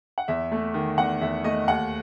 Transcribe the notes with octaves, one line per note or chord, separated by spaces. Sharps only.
F#5
E2 E5
A3
D#3
E2 F#5
E2 E5
A3 D#5
D#2 F#5